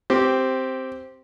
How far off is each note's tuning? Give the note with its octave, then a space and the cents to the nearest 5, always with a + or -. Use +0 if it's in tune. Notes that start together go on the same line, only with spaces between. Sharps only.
C4 +0 G4 -10